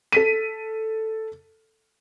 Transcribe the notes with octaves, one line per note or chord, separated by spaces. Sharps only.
A4 B6 D#7